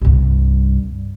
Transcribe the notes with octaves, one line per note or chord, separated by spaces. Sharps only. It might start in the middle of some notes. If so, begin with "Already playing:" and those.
C2 G2